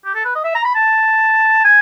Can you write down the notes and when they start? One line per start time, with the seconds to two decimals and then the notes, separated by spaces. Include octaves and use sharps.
0.05 G4
0.15 A4
0.25 B4
0.35 D#5
0.44 E5
0.55 A#5
0.65 B5
0.75 A5
1.64 G#5